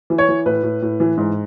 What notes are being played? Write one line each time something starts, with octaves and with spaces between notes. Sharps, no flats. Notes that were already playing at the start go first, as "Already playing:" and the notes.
E3
C#5
E3
A2 B4
A2
A2
E3
G#2